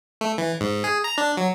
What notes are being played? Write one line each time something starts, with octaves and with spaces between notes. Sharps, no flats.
A3
E3
G#2
G#4
A#5
D4
F#3